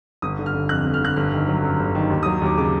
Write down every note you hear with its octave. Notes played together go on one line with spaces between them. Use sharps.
G1 D#6
D3
F6
G1
F2 F#6
G1
F6
D3 F#6
G1 F6
D#3
F#3
F#2
G1
D#3
D#2
D#6
F#3
D#2 D6
C#3 D6